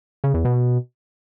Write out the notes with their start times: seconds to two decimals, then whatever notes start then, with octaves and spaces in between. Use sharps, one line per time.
0.24 C#3
0.34 E2
0.45 B2